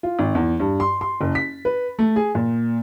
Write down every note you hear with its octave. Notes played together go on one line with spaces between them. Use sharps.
F4
G#1
E2
G2
C6
C6
F#1
B6
B4
A3
G#4
A#2